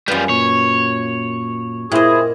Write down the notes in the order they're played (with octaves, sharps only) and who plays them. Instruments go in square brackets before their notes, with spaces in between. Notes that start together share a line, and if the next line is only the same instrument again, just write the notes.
[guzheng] F#2 B4 [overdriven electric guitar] G3 F4
[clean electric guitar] A#2 [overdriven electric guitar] C#5
[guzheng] A#2 D#5 [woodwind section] E4 G#4 [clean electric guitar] G4 C5